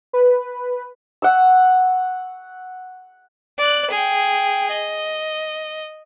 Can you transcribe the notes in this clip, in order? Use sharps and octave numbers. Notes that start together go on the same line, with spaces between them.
B4
F#5 C#6 E6
D5 F#6
G#4 G5
D#5